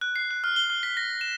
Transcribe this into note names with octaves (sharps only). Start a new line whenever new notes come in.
F#6
C7
F#6
F6
G7
F6
B6
A#6
E7